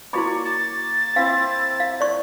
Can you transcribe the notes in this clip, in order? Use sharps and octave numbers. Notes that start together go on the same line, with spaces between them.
A#3 E4 F#4 C#5 D5 B5
A6
C4 E4 F5
F5
D5 C#6